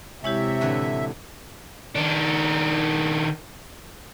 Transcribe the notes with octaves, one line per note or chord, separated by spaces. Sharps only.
C3 G#3 E4 G4 C#5 E5
A2 D3 E3
D#3 D4